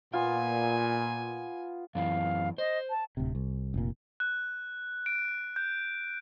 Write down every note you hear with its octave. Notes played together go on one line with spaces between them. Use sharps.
A#2 B3 F4 G#5
F#2 E3 F5
C5 D#5
A5
D1 C3
C2
F1 A#2
F#6
D7
G6